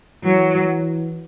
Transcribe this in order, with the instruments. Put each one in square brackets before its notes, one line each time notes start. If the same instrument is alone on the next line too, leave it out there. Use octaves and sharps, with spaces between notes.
[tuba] E3 [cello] F#3